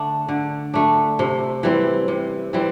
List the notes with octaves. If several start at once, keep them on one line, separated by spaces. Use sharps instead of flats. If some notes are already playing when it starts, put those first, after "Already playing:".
Already playing: D3 A3 D4
D3
A3 D4
C3
E3 G3 C4
C3
E3 G3 C4